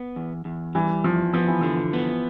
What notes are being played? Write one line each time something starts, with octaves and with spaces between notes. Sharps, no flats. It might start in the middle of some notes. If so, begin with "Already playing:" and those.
Already playing: B3
E2
E2
E3 G3
E2 F3
F3 B3
E3
D3 F3
B3